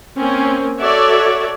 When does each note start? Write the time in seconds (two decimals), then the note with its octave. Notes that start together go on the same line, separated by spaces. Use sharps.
0.16 A#3 C4 C#4
0.78 F#4 A4 C#5 D5 E5